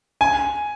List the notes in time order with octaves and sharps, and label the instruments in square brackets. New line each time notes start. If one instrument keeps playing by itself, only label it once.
[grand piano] G#5